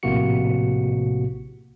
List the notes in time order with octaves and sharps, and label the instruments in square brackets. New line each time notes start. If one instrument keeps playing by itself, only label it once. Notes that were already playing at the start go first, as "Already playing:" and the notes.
[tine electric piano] A#1 A2 C3 A#3 F#4 C#7